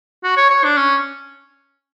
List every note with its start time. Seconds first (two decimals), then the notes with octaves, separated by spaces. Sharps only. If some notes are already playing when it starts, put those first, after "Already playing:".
0.23 F#4
0.37 C#5
0.50 C#5
0.64 D4
0.77 C#4